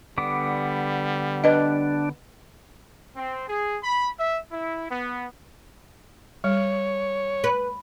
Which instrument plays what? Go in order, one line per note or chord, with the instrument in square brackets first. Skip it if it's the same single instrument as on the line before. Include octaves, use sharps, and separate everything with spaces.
[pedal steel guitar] D3 B3 D6 [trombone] G3
[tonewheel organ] D4 [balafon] B4 D#5
[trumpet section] C4
G#4
B5
E5
E4
B3
[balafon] G3 [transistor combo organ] C#5
[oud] B4